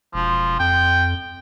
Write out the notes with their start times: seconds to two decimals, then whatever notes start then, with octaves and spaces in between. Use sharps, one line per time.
0.14 E1 F3
0.60 F2 G5